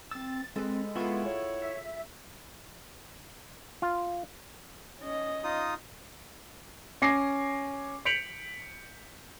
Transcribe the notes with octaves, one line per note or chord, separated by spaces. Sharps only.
C4 E6 A6
G#3 C4 A4 B4
B3 E4 F4 G#4 A4 F#5 C#6
C#5
E5
F4
C#4 D#5
D#4 F4 D#6
C#4 G#5 D6 A#6 C7
G6 B6 C#7 D7 F7 F#7